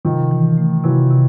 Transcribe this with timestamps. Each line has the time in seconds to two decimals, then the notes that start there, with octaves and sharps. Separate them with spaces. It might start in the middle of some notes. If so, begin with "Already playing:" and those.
0.05 C3 D#3 F3
0.31 E3
0.57 A3
0.84 C3 E3 F#3
1.11 C3